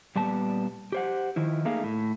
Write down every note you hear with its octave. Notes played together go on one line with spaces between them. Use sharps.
A#2 G3 B3 A5
G4 C5 F#5
D#3 F3 E4
A3 A#3 D#4 G#4 F5
A2